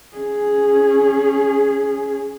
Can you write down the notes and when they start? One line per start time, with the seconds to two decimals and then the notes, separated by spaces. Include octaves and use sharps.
0.16 C#4 G#4